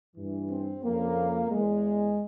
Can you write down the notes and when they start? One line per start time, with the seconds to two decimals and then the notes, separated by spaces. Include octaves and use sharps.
0.16 G2 E3
0.49 C4
0.83 F2 C#3 F3 A#3
1.51 E2 E3 G#3